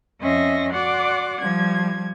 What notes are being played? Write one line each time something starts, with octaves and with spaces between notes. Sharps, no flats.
F2 C#4 D#5 E5 C6 A#6
F#4 D5 F#5 C6 D6
F3 G3 G#6